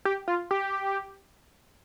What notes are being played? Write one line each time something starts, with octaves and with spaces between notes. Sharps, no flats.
G4
F4
G4